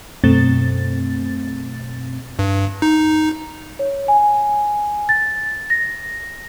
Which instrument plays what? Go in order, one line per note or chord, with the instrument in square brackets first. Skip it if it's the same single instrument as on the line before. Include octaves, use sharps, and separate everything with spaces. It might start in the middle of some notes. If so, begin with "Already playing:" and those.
[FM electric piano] F#2 B2 A3 C4 A6
[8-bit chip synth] G2
D#4
[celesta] C#5
G#5
A6
A#6